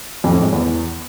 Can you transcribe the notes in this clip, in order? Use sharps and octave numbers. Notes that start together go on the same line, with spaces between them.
F2
A2
G#3
E2